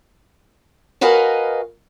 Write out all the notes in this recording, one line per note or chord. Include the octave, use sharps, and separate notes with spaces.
F#4 A#4 B4 D#5 F5 G#5